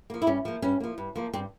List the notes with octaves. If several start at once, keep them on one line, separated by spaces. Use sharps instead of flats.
F3 A#3
E4
G2 C#4
F3 A#3
G2 C#4
F3 A#3
G2
F3 A#3
G2 C4